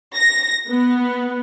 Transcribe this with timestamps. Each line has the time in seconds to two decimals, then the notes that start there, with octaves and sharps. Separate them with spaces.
0.15 A#6
0.70 B3